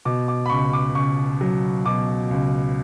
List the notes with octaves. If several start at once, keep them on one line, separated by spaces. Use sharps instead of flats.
B2 D6
D6
B5
C#2 C#6
D6
C#2 C#6
F#3
B2 D6
C#2